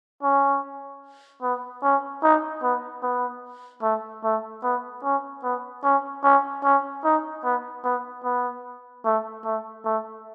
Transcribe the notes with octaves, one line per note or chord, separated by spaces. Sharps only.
C#4
B3
C#4
D#4
B3
B3
A3
A3
B3
C#4
B3
C#4
C#4
C#4
D#4
B3
B3
B3
A3
A3
A3